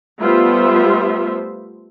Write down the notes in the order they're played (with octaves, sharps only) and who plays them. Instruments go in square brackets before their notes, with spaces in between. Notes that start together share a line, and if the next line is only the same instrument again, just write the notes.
[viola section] G3 A3 B3 F4 C5 E5